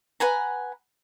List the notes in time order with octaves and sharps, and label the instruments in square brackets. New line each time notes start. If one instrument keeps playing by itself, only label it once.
[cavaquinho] B4 F#5 G#5 A#5